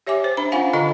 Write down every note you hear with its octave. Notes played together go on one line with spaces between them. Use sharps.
G4 C#5 E5 G#5 D6
C5
D4 B5
C#4 F4 F5 F#5 G#5
D3 F4 A4 D#5 A#5